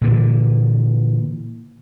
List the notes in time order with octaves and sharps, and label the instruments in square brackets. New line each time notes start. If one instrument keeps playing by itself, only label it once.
[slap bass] A#2 D3 E3